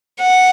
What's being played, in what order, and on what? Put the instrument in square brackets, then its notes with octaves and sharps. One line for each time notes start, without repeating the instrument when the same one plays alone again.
[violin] F#5